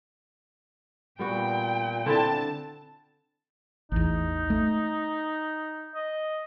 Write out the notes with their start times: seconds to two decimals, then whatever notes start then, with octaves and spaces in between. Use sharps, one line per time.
1.19 A#2 G3 B3 F#4 G5
2.06 D3 C4 E4 A5
3.92 A1 E2 D#4
4.50 A3
5.95 D#5